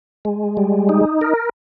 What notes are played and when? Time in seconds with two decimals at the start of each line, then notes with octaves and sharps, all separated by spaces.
0.25 G#3
0.57 G3
0.89 D#4
1.21 A#4